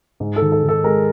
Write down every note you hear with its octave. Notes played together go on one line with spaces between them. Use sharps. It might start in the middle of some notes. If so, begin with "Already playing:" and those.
G#2
A4
D#3
A4
D#3
A4
G#3 A#4